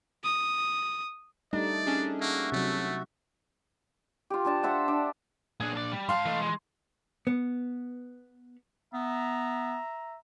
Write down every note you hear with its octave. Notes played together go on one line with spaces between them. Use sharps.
D#6
G3 A3 D4 D#4 D5
C#4 D4 G#4
A#3 F#4 E5
C3 F#3 A3
F4 G4
F3 D4 A5
A4 C5 E5 F#5
D4
B1 A#2 D4 G#4
D5
G3
G#2 F5 A5 C6
E3 A3 D#5
G#3
B3
B3 E5 A#5